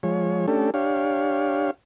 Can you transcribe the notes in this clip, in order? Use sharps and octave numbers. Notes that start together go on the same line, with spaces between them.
F3 G#3 C#5
A3 C#4 D4 G4 A4
D4 G4 C#5 F5